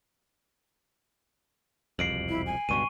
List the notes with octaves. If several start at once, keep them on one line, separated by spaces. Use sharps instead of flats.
E1 C2 F2 C7 D7 F#7
E4
G#5
C#2 G2 B2 C#6 D#7